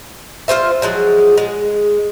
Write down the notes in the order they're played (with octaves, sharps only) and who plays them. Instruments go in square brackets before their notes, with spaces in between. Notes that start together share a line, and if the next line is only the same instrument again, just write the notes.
[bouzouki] F4 G4 C5 E5
F3 F#3 G#3 G#4
G#3